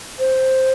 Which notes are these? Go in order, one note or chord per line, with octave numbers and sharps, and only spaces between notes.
C5